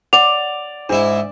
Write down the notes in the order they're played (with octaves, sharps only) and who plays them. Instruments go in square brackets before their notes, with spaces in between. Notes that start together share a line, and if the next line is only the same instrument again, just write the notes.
[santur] D5 [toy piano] F#5 [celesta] F7
[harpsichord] G#2 E4 [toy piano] D4